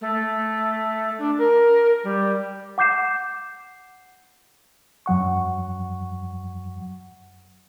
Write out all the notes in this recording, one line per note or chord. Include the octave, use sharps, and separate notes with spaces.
A3
D4
A#4
G3
F#5 D6 G6 C7 E7
F#2 F#3 F#5 C#6